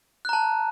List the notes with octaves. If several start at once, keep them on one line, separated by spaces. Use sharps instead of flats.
A5 A#5 F#6